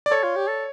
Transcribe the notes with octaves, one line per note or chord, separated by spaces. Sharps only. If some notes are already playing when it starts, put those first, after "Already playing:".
D5
A4 C#5
F4
G4
A4